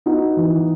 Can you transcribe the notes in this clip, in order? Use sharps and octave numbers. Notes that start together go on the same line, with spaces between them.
B3 D#4 F#4
E3